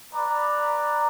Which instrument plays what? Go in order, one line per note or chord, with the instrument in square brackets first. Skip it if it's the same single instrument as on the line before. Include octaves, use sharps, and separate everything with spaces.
[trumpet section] B4 D5 A#5